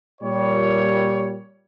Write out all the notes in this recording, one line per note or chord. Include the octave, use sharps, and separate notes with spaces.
A#2 G3 C#5